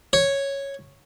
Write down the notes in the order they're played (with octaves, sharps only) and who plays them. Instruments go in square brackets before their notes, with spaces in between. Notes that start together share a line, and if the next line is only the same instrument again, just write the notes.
[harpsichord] C#5